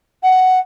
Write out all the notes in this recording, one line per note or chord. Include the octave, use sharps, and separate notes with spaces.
F#5